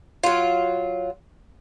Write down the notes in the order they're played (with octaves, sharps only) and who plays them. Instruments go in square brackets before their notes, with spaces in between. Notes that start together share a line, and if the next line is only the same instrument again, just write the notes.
[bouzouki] F#3 F4